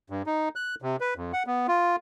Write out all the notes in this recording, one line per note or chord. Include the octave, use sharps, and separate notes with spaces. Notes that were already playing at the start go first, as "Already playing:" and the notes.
G2
D#4
F#6
C3
B4
F2
F#5
B3
F4